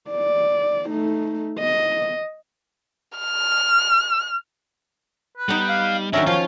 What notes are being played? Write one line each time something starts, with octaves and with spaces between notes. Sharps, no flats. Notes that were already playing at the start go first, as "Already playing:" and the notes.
D5
A3 D#4
D#5
F6
B4
G3 B3 D#4
F5
D#3 F#3 C#4 D4 E5 A#5
F3 F4 C#5 F5